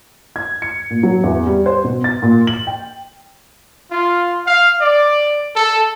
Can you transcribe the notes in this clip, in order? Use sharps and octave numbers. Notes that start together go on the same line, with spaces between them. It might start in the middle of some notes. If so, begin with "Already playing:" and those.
G#6
C#7
A#2
F#3
E2
G3
C5
B2
A6
A#2
F#7
G5
F4
F5
D5
A4